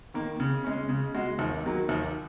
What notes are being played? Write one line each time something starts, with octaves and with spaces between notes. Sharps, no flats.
D#3 A#3
C#3
G#3 C#4
C#3
G#3 F#4
D#2
D#3 F#3 A#3
D#2